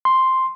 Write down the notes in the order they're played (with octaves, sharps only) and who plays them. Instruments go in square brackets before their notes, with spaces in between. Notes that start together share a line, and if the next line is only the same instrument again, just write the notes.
[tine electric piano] C6